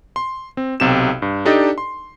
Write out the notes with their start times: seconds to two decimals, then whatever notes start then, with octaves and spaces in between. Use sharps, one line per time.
0.16 C6
0.57 C4
0.80 B1 C3 G4 E7
1.22 G2
1.45 D4 D#4 G4 A4 D5 D#5
1.78 C6